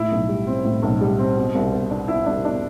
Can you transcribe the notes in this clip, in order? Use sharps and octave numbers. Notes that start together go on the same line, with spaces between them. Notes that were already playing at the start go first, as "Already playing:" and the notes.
Already playing: A2 E4
B1
G3
C4
A2
B1
G3
C4
B2
C2
B3
D4
B2 E4
C2 D4
B3 D4